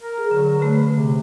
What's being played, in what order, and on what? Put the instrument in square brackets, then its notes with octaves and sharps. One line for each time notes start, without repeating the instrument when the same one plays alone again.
[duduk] A#4
[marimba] G#4
[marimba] D3 [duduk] F#3
[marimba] D3 A3 [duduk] B4
[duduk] C#3
C3